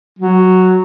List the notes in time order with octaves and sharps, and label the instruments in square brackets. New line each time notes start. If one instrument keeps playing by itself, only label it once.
[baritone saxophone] F#3